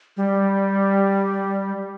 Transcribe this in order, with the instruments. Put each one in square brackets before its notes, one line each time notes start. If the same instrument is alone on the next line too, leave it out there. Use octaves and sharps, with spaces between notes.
[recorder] G3